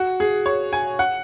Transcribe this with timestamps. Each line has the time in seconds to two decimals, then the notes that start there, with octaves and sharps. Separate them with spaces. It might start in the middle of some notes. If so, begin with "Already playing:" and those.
Already playing: F#4
0.20 G#4
0.46 C#5
0.73 G#5
0.99 F#5